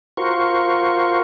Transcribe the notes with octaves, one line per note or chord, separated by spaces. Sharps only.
F4 F#4 A#4 C5 C#6